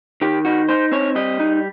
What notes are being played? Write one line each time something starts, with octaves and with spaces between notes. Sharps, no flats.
D#3 G4
D#4 F#4
D#4 C5
C4 C#5
G3 D#5
D#4